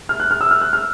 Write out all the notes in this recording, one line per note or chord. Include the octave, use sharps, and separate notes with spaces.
F6
F#6
F6
E6
F6
F#6
F6